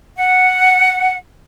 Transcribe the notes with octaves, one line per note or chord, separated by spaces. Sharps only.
F#5